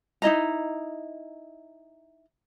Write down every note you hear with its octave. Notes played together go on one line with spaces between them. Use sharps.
D#4 E4 D#5 A#5